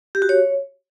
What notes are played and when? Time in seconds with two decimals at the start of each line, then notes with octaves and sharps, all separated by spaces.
0.15 G4
0.22 F#4
0.29 C#5